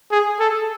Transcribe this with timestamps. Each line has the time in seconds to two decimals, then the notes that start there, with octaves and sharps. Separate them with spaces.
0.11 G#4
0.40 A4